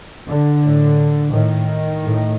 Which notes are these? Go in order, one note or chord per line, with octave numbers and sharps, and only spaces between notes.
D3
A2
A2 D#3
A2